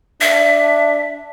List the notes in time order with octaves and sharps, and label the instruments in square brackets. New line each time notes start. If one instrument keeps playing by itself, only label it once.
[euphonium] D4 [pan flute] E5